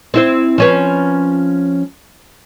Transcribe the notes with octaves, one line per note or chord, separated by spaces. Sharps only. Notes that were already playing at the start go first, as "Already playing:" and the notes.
C4 E4 C5
F3 C#4 B4